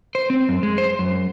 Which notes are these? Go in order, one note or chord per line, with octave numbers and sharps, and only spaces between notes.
C5
C4
F#2
G#3
C5
F#2